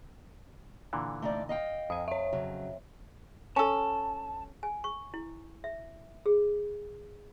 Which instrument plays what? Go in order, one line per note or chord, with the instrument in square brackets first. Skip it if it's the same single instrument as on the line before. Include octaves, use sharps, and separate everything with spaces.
[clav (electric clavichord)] A#2 D3 E3
[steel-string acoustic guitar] A3 D#4 D5
D#5 F5 G5
[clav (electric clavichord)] F2 G#5 [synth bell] D#6
[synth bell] C#5 E5
[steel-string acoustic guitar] C#3 F#3
[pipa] C#4 A4 [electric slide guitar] A5
[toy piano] G#5
C#6
E4
E5
G#4